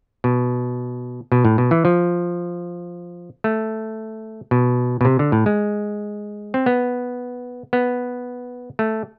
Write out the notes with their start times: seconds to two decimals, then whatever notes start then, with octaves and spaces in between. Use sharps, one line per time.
0.24 B2
1.32 B2
1.45 A2
1.58 B2
1.71 E3
1.85 F3
3.44 A3
4.51 B2
5.01 B2
5.05 C3
5.19 D3
5.32 A2
5.46 G#3
6.54 C4
6.66 B3
7.73 B3
8.79 A3